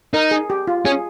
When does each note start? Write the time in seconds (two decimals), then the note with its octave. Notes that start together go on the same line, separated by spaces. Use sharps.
0.14 D#4 A#4
0.31 G#4
0.50 G4
0.67 F4
0.85 C#4 G#4